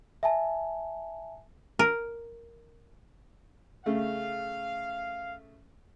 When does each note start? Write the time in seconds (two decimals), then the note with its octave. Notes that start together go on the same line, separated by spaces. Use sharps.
0.23 E5 G#5 A5
1.79 A#4
3.86 C#3 A3 F5